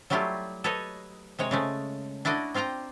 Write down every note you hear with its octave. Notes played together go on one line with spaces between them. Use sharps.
F#3 G3 A3 E4 F4 G4
A4 B4 C#5 D#5
C3 G#3 C#5
C#3 G#3 A3
D4 E4 F#4 D5 D#5
C4 F4 F5 G5 A#5